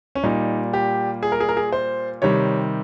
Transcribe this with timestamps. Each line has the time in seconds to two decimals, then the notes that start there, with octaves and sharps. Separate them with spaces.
0.15 C#4
0.23 A#2 G3 D#4
0.74 G4
1.23 G#4
1.32 A#4
1.40 G#4
1.49 A#4
1.57 G#4
1.72 C5
2.22 C3 D#3 G3 C#5